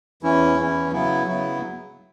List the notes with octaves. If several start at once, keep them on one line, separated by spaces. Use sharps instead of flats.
E2 E3 C#4 E4
E2 E3 C#4 E4
C#3 F#3 B3 E4
C#3 F#3 B3 E4